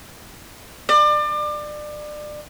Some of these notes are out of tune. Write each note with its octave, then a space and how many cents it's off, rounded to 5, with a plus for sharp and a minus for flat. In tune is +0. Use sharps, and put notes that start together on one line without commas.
D5 +30